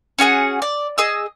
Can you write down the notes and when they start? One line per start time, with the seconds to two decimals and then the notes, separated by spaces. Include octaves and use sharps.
0.19 C#4 F#4 G#4 F#5
0.62 D5
0.98 G#4 D#5 D#6 E6